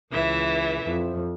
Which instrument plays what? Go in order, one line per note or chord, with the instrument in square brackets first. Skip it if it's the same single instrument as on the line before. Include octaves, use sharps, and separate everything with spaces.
[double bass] C#2 [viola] E3 E5
[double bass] F2